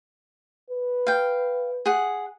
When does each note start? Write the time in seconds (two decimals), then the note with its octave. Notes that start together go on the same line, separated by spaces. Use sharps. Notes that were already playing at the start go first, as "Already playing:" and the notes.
0.70 B4
1.07 F5 G5
1.86 G#4 F#5